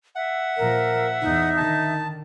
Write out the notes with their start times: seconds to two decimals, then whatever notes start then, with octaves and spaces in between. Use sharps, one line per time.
0.16 E5 F#5
0.57 A#2 F3 A#4
1.22 E2 D#4
1.57 D3 D#3 A5